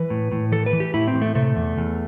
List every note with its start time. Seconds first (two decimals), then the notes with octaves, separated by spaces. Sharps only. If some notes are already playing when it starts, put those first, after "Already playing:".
Already playing: E3 B4
0.10 A2
0.32 A2
0.52 E3 A4
0.66 B4
0.73 E3
0.80 G4
0.94 A2 E4
1.08 C4
1.15 A2
1.22 A3
1.35 C3 A3
1.56 E2
1.78 E2